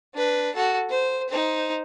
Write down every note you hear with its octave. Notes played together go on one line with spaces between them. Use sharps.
D4 B4
F#4 A4
C5
D#4 C5